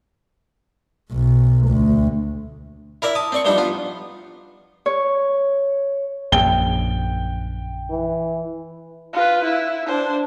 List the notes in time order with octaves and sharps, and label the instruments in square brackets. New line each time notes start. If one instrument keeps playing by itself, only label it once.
[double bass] B1
D2
[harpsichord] E4 A#4 D5 E5
A5 D#6
C4 D5 C#6
E3 F3 G3 D4 D#4
B3 F4
[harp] C#5
[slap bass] A#1 F#2 [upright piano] G5 G7
[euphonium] E3
[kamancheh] F4 B4
E4
D4 C5